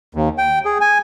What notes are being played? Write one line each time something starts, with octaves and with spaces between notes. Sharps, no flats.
D#2
G5
G#4
G#5